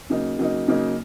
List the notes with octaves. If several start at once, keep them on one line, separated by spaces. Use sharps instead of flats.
C#3 F#3 A#3 D#4
C#3 F#3 A#3 D#4
C#3 F#3 A#3 D#4